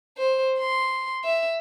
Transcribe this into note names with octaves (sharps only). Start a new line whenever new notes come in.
C5
C6
E5